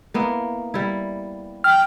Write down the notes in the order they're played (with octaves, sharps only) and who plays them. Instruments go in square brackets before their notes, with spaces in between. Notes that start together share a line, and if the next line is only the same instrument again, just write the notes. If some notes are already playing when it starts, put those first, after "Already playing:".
[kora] A#3 B3 E4
G3 E4
[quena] G5 [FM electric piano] F6